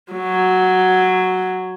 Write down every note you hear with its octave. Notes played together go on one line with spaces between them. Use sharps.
F#3